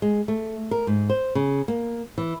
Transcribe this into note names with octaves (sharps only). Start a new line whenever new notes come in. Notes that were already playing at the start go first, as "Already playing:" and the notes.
G#3
A3
A#4
G#2
C5
C#3
A#3
E3